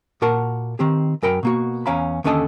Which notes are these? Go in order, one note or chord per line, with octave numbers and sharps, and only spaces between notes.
A#2 F#4 A#4 F#5 A5
D#3 C4 G4
F#2 A#4 G5 B5
B2 A#3 F#4
E2 C#4 F5 A#5 B5
D#2 D3 C#4 A4 D#5 A5